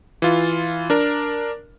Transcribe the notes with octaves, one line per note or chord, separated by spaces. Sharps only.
E3 F4
D4 A#4